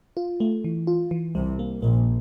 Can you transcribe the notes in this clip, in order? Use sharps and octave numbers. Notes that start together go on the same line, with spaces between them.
F4
A3
E3
F4
E3
C2 C3 G3
A#3
A#1 A#2 A#3